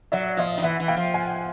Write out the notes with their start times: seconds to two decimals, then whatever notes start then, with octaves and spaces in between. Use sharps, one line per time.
0.12 F#3 D5 E5
0.37 F3 D#5 F5
0.57 D#3
0.62 E3 E5 F#5
0.80 E3
0.88 F5 G5
0.97 F3
1.14 F#5 G#5